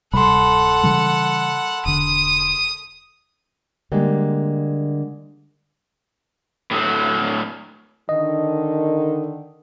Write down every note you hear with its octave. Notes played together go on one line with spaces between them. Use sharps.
D1 C3 G3 A4 F#5 B5 C6
C#3 E3 G3
E1 D3 D#6
D3 G3 G#3 A#3
A2 F#3
D3 D#3 D#5